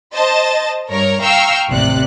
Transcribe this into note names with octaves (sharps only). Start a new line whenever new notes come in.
C5 D#5 A5 A6
G2 A#4 C#5 A#5
F5 G5 A#5 C#6 E6 F6
A1 D#2 C3 D5 F#6